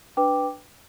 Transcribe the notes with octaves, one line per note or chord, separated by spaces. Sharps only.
D4 B4 G5 D6